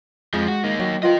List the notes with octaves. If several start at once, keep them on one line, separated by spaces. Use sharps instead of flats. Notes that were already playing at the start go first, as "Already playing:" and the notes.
F2 F3 G#3
F#4
A#3 D#4
F#3 G5
F4 A#4 B4 D#5 G5